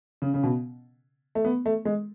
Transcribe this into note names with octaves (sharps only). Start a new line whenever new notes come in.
C#3
C#3
B2
A3
B3
A3
G#3